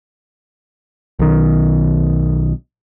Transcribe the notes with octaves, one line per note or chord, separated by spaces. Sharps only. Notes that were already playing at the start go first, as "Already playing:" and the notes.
B1 D#3